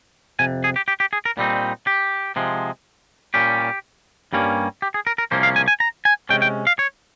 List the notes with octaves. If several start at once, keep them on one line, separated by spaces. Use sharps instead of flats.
F2 C3 G#5
G#4
G4
G4
G4
G#4
A#4
A#2 G3 C4 D#4
G4
C3 F3 G#3
A#2 G3 C#4 G4
G2 G3 A#3 C#4
G4
G#4
A#4
A#4
C2 C3 F3 A#3 C#4 C5
F5
G#5
G#5
A#5
G#5
C3 D#3 G#3 C#4 G5
G5
F5
C#5